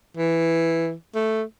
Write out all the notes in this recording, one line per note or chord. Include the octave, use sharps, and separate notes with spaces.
E3
A3